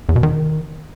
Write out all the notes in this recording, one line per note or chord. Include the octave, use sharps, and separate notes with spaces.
E2
B2
D#3